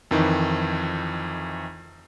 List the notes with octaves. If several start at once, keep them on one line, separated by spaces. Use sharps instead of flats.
F2 D#3 E3